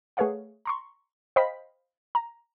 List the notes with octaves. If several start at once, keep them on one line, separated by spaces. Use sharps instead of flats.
A3 G#4 B4 C#5 F5 F#5
A#5 C6 C#6
C5 D#5 F5 G5 B5 B6
A#5